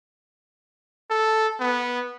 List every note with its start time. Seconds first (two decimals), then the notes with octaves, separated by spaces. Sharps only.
1.10 A4
1.60 B3